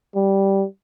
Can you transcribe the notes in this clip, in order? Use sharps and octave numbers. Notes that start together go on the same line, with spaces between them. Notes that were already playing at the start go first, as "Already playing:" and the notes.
G3